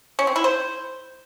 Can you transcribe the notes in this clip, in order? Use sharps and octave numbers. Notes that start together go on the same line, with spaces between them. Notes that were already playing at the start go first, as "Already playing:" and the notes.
C#4
C4
E4
C5